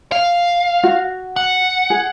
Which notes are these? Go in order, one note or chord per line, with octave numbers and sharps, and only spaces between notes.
F5
F#4
F#5
G#4